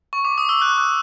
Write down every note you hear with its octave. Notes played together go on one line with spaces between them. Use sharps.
C#6
D6
D#6
E6
F#6
F#6